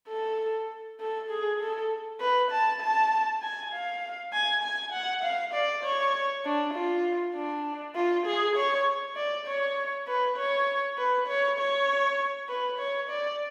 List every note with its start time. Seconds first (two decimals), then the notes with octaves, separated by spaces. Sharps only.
0.09 A4
1.00 A4
1.30 G#4
1.60 A4
2.20 B4
2.51 A5
2.81 A5
3.42 G#5
3.72 F5
4.33 G#5
4.63 G#5
4.92 F#5
5.24 F5
5.54 D5
5.84 C#5
6.45 D4
6.74 F4
7.35 D4
7.96 F4
8.26 G#4
8.56 C#5
9.16 D5
9.47 C#5
10.07 B4
10.37 C#5
10.98 B4
11.28 C#5
11.59 C#5
12.49 B4
12.79 C#5
13.10 D5